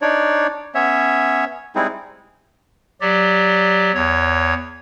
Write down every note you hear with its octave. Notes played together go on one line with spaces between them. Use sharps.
D4 D#4 C#5 D5
B3 C#4 C#5 E5
G3 G#3 C4 D#4 E4 G#4
F#3 G4 D5
E2 C#5